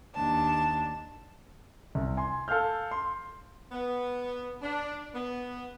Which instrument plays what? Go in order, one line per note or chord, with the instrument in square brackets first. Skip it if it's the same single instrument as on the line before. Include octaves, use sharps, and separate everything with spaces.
[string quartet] D#2 D4 A5
[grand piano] C2
G#5 C6
A4 F5 G#5 F6 G6
C6
[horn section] B3
D4
B3